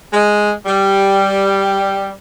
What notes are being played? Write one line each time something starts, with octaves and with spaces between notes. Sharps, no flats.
G#3
G3